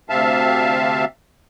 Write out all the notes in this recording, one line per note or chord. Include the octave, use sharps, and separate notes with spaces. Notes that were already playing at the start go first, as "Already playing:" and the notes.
D2 C3 C4 E5 F5 A5